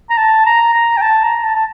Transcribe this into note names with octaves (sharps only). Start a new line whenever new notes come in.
A#5
A5
A#5
A#5
G5
A5
A#5
A5
A5